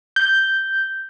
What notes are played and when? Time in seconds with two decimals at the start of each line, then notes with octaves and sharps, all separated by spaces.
0.16 G6